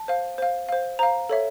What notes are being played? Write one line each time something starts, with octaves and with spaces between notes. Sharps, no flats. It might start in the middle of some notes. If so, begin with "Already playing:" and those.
Already playing: A5
C5 F5
C5 F5
C5 F5
C5 F5 A#5
A4 C#5 E5